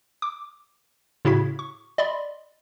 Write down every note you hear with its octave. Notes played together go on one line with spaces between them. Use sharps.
D6
A2 C#3 E4 F#4 G#6 B6
C#6
D5 D#5 B5 C6